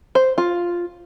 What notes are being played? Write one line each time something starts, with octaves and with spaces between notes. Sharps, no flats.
C5
F4